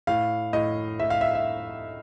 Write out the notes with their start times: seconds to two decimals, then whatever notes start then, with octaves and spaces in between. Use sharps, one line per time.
0.07 A2 F5
0.53 A2 D#5
1.00 A2 E5
1.10 F5
1.21 E5
1.35 E5